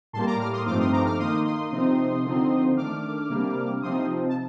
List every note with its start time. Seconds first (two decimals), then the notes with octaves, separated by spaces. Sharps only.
0.13 A2 G3 A#3 A5 C6
0.27 A#5 D6
0.40 D6 F6
0.52 C6 D#6
0.66 G2 F3 A3 C4 D#4 D6 F6
0.79 C6 D#6
0.92 A#5 D6
1.05 D6 F6
1.18 D#3 A#3 D#4 C6 D#6
1.45 C6 D#6
1.72 C3 F3 C4 D#4
2.24 D3 F3 C4 D#4
2.76 D#3 A3 D4 D6 F6
3.30 C3 G3 A#3 D4
3.82 C3 F3 C4 D#4 C6 D#6
4.29 A5